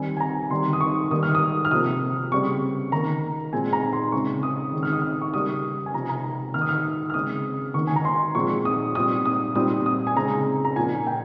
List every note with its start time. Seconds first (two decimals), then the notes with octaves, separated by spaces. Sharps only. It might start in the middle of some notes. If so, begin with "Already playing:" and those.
Already playing: D#3 G3 C4 G#5
0.17 G#5
0.20 A#5
0.50 D#3 G3 C4 C6
0.73 D#6
0.80 C#6
1.11 D#3 G3 A#3 D#6
1.23 F6
1.35 D#6
1.65 F6
1.71 C3 F3 A#3 D#6
2.32 C#3 G3 C4 C#6
2.92 D#3 A#3 A#5
3.53 A#2 G#3 C4 G#5
3.73 A#5
3.93 C6
4.12 C#3 G#3 C4 C#6
4.43 D#6
4.73 D#3 G#3 C4
4.83 F6
4.93 D#6
5.02 F6
5.22 C#6
5.34 C#3 G3 A#3 D#6
5.86 G#5
5.94 C3 F3 C4 A#5
6.09 A#5
6.24 A#5
6.54 D#3 A#3 F6
6.62 D#6
6.69 F6
7.10 F6
7.14 C#3 G#3 C4 D#6
7.74 D#3 A#3 C#6
7.87 G#5
7.96 A#5
8.05 C6
8.35 A#2 F3 G#3 C4 C#6
8.65 D#6
8.95 A#2 G3 C4 D#6
9.26 D#6
9.55 A#2 G3 C4 D#6
9.86 D#6
10.07 G#5
10.16 C#3 G#3 C4 A#5
10.65 A#5
10.76 A#2 F3 A#3 G#5
11.07 G5